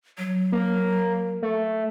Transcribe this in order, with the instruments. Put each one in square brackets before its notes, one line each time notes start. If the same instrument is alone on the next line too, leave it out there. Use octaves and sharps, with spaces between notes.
[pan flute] F#3
[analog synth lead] A#3
A3